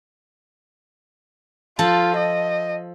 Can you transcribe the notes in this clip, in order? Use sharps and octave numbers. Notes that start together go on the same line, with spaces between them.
F3 F4 A4 A5
D#5